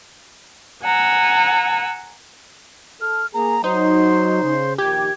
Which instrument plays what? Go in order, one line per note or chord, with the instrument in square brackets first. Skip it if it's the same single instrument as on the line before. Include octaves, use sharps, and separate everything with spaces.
[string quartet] F#5 G#5 A#5 E6
[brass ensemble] A4 [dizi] F6
[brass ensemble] A#3 G#4 [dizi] A#5
[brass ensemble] F#3 [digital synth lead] D#4 [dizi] C5
[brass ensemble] C#3
[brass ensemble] A#1 D#3 [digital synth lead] G4 [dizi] G#6